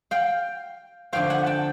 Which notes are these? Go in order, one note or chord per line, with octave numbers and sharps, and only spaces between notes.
F5 G5
D3 F3 A3 C4 F5 G5
F#5 G#5
G5 A5